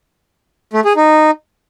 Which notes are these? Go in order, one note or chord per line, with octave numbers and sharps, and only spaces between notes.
A3
G#4
D#4